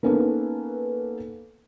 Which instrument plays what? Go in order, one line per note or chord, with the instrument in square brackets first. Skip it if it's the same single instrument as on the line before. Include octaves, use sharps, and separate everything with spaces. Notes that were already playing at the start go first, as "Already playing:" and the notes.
[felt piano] A#3 B3 C#4 D#4 A4 B4